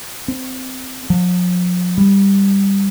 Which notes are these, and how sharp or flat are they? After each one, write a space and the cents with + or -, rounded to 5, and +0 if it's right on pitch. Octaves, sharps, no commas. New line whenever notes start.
C4 -15
F3 +45
G3 +10